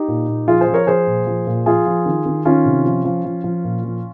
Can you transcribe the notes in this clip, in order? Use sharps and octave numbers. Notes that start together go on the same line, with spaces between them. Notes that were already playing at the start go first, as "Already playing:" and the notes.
Already playing: D#4 G4
A#2
A#2
F3 F4 G#4
G#4 C5
F3
A#4 C#5
F3 G#4 C5
A#2
F3
A#2
F3 F4 G#4
F3
D#3
D#3
D#3 C#4 F4
C3
F3
F3
F3
F3
A#2
F3